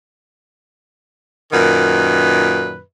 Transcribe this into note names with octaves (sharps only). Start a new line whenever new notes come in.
F#2 A#2 D#3 B4